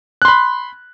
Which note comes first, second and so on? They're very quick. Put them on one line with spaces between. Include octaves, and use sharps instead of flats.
F#6 C6 B5